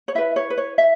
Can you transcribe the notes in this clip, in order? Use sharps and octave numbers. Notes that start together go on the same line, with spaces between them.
C#5
E4 B4 E5
C#5
B4
C#5
E5